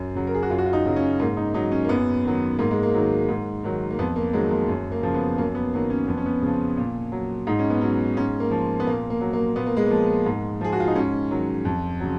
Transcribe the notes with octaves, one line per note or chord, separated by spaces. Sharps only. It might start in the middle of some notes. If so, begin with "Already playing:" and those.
Already playing: F#2
C#3 F#3
A#4
G#4
F#4
F#2 F4
F#4
F4
D#4
C#3 F#3
C#4
G#2 A#3
D#4
F#3 D#4
C#4
A#3
F#2 B3
D#3 F#3
G#2 A#3
G#3
A#3
D#3 F#3
G#2
D#3 F#3
A#3
F2 B3
A#3
D#3 F#3 G#3
A#3
F#2
A#3
C#3 F3
B3
F#2 A#3
B3
D#3 F#3 A#3
C#4
F2 B3
C#4
B3
C#3 F3
A#2
F#3
G#2 D#4
C#4
B3
F#3 C#4
G#2 C#4
A#3
F3
B3
A#2 A#3
A#3
F#3
A#3
A#2 B3
A#3
G#3
F3 A#3
G#2
F3 G#4
F#4
F4
D#4
G#2 C#4
D#3 F#3
F2
C#3 F#3